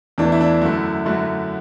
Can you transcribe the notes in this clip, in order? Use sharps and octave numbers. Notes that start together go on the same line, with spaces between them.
E2 E3 A3 D4
E4
D4
F#2 D3 A3 E4
F#2 D3 F#3 A3